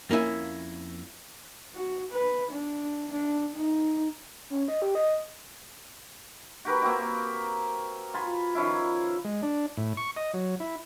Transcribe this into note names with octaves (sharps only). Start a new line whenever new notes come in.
F2 A#3 C#4 E4 G#5
F#4
B4
D4
D4
D#4
C#4
D#5
G4
D#5
F#4 G4 A#4 B4
A#3 C4 F#4 G4
F4 G#5 B5
D#3 F3 C#4 E4
G#3
D4
A2
C#6
D#5
F#3
E4